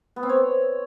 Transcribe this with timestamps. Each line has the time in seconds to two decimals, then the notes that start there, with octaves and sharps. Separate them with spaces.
0.16 B3
0.23 C4
0.29 C#5